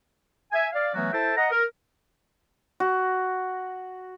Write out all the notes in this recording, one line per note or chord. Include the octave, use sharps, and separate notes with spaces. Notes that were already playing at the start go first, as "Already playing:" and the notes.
E5 G#5
D5 F5
E3 F#3 A3 B3 C#4 F#4
E4 A4 C5 E5 G5 A5
D#5 F#5 A#5
A#4
F#4